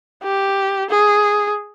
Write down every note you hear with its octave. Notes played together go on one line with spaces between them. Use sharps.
G4
G#4